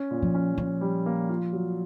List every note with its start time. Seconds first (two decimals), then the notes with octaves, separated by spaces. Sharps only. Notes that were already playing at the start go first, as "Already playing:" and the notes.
Already playing: C#4
0.11 A#2
0.22 F3
0.35 C#4
0.57 F3 C#4
0.81 G3
1.06 A#3
1.29 F4
1.53 F#3